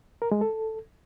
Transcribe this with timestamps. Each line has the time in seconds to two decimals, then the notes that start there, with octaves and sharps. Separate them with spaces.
0.22 A#4
0.31 G#3
0.41 A4